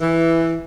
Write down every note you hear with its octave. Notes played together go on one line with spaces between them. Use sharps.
E3